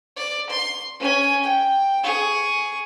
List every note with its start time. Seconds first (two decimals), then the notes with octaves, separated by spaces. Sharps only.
0.16 D5
0.50 C6
1.00 C#4 G#5
1.43 G5
2.03 G#4 C#6